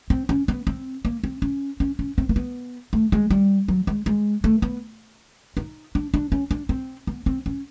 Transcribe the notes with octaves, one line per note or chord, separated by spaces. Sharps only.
C4
C#4
B3
C4
A#3
C4
C#4
C#4
C#4
C4
A#3
B3
A3
G#3
G3
F#3
G#3
G#3
A3
B3
D#4
D4
D4
C#4
D4
C4
B3
C4
C#4